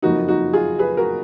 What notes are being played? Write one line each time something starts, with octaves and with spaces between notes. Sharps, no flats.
F#1 F2 F3 A#3 D#4 F#4
D#4 F#4
F4 G#4
G#4 B4
F#4 A#4